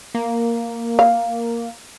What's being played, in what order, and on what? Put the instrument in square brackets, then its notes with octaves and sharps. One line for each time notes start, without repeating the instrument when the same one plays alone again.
[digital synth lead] A#3
[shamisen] F5